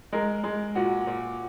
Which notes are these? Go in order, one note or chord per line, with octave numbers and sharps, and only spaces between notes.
G#3 A#4
G#3
A#2 F#4
A#2